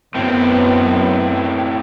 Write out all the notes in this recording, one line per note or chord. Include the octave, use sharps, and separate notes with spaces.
F#2 A2 B3 C4